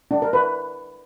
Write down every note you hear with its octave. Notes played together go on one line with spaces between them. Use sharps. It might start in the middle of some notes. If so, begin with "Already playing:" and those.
D4
A#4
B4